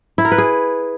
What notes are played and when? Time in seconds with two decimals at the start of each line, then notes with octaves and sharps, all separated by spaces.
0.18 E4
0.25 A#4
0.32 B4
0.38 G#4